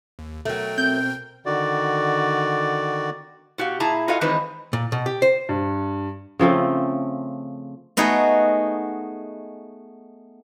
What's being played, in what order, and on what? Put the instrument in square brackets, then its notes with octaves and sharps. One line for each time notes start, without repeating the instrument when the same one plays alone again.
[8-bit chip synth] D#2
[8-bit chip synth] B2 A#4 G5 [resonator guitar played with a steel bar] F#3 A3
[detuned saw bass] C4 [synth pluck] G6
[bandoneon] D3 D#3 F#4 D5
[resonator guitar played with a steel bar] B2 F#4 G4 F5
A#2 E4 G#4 A5 A#5
F4 F#4 A4 D#5 F5 G#5
D#3 E3 G#3 C4 D#4 B4
[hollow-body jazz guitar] A#2
B2
G4
C5
[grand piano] G2
[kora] C#3 F3 A3 C4
[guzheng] A3 B3 D#4 F#4 G#4